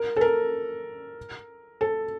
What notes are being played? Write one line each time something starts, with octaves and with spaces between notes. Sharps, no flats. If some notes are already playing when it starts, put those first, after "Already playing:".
Already playing: A#4
A4
A#4
A4